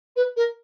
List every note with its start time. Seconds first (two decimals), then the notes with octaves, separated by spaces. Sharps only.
0.16 B4
0.36 A#4